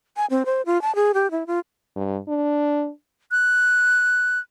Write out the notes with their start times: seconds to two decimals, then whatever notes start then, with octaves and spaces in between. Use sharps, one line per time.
0.17 G#5
0.30 C4
0.46 C5
0.66 F4
0.82 A5
0.95 G#4
1.14 G4
1.31 E4
1.47 F4
1.96 G2
2.28 D4
3.31 F#6